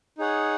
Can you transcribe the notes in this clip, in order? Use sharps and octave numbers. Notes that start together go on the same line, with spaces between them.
D#4 G#4 C#5 F#5